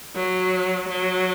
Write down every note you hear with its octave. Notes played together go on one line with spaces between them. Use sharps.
F#3
F#3